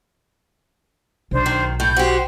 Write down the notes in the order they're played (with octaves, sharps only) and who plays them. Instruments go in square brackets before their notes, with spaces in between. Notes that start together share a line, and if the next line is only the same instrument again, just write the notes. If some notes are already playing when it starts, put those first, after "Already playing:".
[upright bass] B1 [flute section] D4 C5
[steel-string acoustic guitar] D#3
[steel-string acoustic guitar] A2 [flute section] G6
[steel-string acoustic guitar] F#4 G4 [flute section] C5